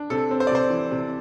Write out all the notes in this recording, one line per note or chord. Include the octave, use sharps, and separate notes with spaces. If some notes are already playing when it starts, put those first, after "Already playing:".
Already playing: D4
C3 A4
C4
C5
D5
C3 C5
E3
C3